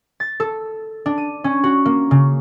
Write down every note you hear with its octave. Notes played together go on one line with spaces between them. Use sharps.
A6
A4
D4
D#7
C#4
F#4
A#3
C#3